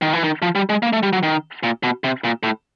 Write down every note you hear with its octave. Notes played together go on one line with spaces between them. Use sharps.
D#3
E3
D#3
F3
G3
G#3
A#3
A3
G3
F#3
D#3
A#2
B2
C3
A#2
A2